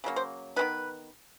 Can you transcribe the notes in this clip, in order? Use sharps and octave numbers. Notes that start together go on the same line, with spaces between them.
C#3 F#3 A#3
C5
D#3 G#3 B3 B4